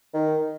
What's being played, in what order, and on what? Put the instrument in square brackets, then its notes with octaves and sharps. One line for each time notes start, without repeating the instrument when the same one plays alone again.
[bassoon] D#3